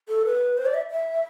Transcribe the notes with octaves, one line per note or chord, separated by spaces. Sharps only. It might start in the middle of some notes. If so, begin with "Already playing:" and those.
A4
B4
C5
D5
E5
E5